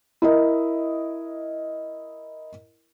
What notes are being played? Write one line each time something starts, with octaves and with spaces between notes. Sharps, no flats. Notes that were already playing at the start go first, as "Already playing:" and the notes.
E4 A#4 D#5